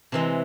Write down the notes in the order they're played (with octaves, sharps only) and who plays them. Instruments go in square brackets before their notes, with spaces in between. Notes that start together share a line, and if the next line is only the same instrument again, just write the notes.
[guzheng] C3 E3 G#3